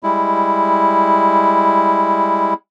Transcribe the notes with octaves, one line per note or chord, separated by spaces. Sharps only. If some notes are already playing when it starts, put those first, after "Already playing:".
G3 G#3 E4